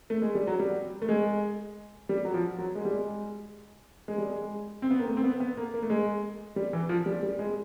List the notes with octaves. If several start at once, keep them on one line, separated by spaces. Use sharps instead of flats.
A3
G#3
G3
F#3
G3
A3
G#3
G3
F#3
F3
F#3
G#3
G3
G#3
G#3
G3
G#3
C4
B3
A#3
A3
C4
B3
B3
A#3
A#3
A3
G#3
G3
E3
F3
G3
G3
G#3